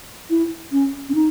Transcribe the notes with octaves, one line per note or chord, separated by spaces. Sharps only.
E4
C#4
C#4
D#4